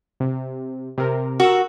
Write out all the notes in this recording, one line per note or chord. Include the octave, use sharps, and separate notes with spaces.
C3
C3 A#4
F#4 A#4 C#6 E6